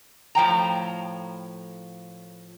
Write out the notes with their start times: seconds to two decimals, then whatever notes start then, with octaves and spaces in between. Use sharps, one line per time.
0.35 A2 F3 G5 A#5